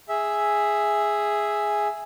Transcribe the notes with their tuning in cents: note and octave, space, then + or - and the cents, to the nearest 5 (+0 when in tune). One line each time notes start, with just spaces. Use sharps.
G#4 +0 E5 +0